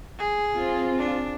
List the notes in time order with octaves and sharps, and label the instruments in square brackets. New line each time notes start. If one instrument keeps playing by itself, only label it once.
[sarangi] G#4
[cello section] C4 F4
[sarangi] D4